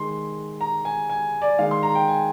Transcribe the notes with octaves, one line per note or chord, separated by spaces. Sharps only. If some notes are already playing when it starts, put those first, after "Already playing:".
Already playing: D#3 G#3 C6
A#5
G#5
G#5
D5
D#3 G#3 F5
C6
A#5
G5
G#5